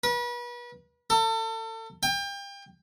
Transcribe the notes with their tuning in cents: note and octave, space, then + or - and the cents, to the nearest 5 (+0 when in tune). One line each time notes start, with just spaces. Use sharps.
B4 -35
A4 +35
G5 +30